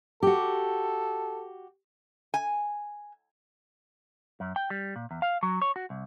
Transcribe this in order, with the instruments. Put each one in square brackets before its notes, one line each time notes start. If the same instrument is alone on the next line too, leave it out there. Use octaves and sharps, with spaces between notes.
[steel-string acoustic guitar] F#4 G4 [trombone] A4
[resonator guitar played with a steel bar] G#5
[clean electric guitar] F#2
G5
G3
A#2
E2
F5
F#3
C#5
F#4
C2